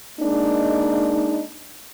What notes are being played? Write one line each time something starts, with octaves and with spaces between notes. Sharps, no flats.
G#3 A#3 D4 D#4